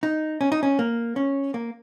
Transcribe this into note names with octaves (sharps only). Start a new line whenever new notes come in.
D#4
C#4
D#4
C#4
A#3
C#4
A#3